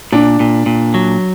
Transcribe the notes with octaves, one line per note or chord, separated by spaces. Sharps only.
A#2 D4
A#2
A#2
F#3